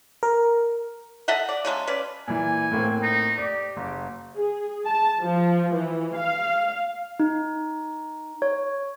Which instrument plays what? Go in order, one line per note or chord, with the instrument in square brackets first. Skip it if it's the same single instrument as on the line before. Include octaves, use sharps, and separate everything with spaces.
[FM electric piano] A#4
[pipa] A4 D#5 E5 F#5
D5
C#3 F#3 G#3 A4
C#4 B4 D5
[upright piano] A#2 E3 [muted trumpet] G#5
[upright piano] A2 A#3 C4
[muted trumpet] D#4
[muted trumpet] G4 [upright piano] D5
[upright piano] F#1
[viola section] G#4
A5
F3
E3
F5
[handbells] D#4
C#5